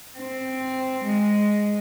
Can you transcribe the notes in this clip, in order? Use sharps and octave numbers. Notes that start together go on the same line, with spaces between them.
C4
G#3